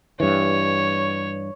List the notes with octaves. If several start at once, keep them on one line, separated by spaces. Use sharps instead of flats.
G2 E3 C#5